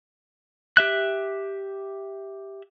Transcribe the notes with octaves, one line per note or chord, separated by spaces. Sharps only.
G4 E5 F#6